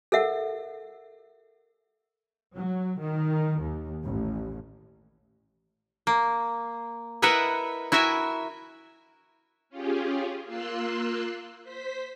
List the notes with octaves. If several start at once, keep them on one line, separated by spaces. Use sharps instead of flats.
A4 A#4 E5 F#5
F#3
D#3
D#2
A1
A#3
E4 A#4 B4 D#5 E5 F#5
E4 F#4 A#4 E5 G#5
C#4 F4 G4 G#4
A#3 F4 C6 E6 F#6
C5 B6